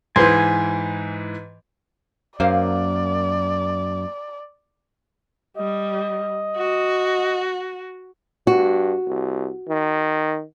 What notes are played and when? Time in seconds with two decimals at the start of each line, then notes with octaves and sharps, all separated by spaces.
0.16 G#2 E3 B4 C5 G#5 C6
2.40 F#2 A#3 C5 D5 F5
5.57 G3 D#5
6.56 F#4
8.47 G2 F#4
9.07 C2
9.69 D#3